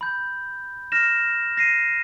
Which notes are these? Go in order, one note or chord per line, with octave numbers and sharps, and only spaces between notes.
B5 G6
F6 A#6 E7
A#6 C7 D#7